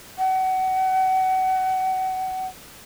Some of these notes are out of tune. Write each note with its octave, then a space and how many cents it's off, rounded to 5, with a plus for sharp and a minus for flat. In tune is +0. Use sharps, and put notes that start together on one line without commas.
F#5 +30